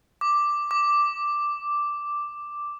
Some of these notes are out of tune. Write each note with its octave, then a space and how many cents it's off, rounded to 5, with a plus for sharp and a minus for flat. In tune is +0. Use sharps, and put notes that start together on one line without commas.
D6 +5
D6 +0